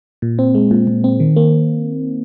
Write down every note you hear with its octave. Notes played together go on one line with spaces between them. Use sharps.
A#2
C4
G#3
A#2
A#2
C4
D#3
A#3